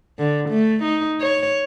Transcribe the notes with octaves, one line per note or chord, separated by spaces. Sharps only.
D3
A3
D#4
C#5